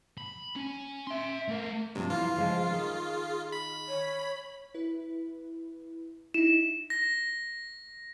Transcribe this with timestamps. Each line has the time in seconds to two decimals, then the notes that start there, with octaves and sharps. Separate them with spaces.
0.17 B5
0.56 C#4
1.07 E5 C6
1.48 A3 A#4
1.95 G2 C3 F3
2.10 E3 F4 F5
2.36 C#3 F3 G#3
2.70 D#3 G#4
3.52 B5
3.89 C#5
4.74 E4 B4
6.34 D#4 E4 E7
6.90 A#6